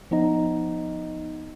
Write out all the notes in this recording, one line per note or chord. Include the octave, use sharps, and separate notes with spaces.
F3 B3 D#4 D#5